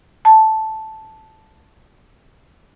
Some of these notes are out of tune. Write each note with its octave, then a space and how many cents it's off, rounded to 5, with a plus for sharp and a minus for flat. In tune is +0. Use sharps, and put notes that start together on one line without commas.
A5 -5